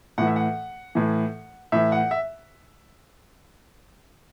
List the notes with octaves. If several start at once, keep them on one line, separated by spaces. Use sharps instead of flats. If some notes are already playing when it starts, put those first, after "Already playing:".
A2 E3 F#5
E5
F#5
A2 E3
A2 E3 E5
F#5
E5